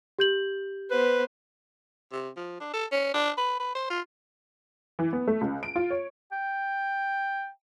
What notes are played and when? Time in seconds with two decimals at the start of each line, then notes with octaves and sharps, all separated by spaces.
0.19 G4 G6 F#7
0.91 B3 B4 C5
2.13 C3
2.37 F3
2.61 D4
2.74 A4
2.92 C#4
3.14 D4
3.37 B4
3.60 B4
3.75 C5
3.90 F4
4.99 E3
5.13 B3
5.27 A3
5.41 C#2
5.63 D7
5.76 F4
5.90 C#5
6.32 G5